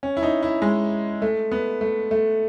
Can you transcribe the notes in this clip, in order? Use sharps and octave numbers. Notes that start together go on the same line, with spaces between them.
C#4
E4
D#4
E4
G#3
A3
B3
A3
A3